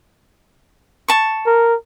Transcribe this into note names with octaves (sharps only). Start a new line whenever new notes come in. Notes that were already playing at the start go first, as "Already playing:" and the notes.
A5 C#6
A#4